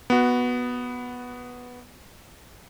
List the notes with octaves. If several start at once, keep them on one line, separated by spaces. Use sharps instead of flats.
B3 F#4